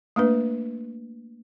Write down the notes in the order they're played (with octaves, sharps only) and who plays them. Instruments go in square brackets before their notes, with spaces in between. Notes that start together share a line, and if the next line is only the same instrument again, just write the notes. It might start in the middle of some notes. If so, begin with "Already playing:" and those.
[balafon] A3 A#3 D4 B4